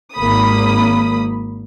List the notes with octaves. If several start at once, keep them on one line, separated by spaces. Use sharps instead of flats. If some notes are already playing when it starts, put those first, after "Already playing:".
G#1 A#3 B5 D#6